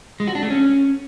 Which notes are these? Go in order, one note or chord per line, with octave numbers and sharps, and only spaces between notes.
G#3
F#4
D4
A3
C#4